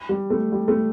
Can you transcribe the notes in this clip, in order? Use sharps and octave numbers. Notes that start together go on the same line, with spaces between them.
G3
A3
G3
A3